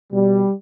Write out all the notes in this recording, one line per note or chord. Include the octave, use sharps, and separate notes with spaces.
B2 G3